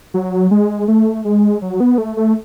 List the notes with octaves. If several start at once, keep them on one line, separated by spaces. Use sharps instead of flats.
F#3
G#3
A3
G#3
F#3
B3
A3
A3